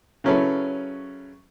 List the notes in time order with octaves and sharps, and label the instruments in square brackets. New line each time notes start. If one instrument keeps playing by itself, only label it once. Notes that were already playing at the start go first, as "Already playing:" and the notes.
[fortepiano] C#3 F#3 C#4 E4 A4 B4